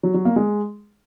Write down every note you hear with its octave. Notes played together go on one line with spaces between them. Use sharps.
F#3
F#3
A#3
G#3